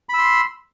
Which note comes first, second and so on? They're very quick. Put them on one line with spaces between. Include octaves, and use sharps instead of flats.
B5 E6 C6